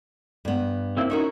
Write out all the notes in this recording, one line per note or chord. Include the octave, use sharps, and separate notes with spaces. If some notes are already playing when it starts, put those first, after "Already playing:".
G2 B3
A#3 C4 E4
C#4 D#4 E4 F#4 A#4 C#6